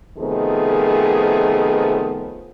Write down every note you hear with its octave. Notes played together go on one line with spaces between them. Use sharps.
C3 D#3 F3 A3 B3 G#4